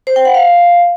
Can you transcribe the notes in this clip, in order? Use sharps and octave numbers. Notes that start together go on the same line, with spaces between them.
C5
G5
F#5
F5